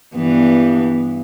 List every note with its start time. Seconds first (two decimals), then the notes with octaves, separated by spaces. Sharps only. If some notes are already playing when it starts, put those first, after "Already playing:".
0.15 G2 E3 B3